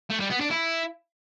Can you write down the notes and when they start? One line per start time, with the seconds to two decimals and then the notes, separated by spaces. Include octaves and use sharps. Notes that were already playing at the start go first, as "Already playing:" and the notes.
0.10 A3
0.20 G3
0.30 B3
0.41 D4
0.51 E4